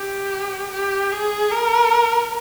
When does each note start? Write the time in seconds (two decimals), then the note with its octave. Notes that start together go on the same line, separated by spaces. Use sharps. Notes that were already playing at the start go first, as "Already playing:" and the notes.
Already playing: G4
0.72 G4
1.12 G#4
1.51 A#4